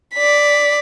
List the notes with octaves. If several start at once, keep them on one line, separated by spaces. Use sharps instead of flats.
D5 B6